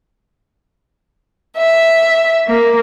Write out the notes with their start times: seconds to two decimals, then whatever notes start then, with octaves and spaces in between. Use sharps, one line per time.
1.56 E5
2.47 A#3